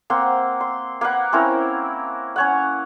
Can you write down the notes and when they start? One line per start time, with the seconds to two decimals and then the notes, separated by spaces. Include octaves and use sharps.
0.10 A#3 C4 F#5 C6
0.60 C6
1.01 A#3 B4 F#5
1.32 C4 C#4 E4 A#4
2.36 C#4 C#5 F#5